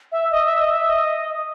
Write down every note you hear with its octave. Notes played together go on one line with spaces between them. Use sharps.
E5
D#5
E5
D#5
E5
D#5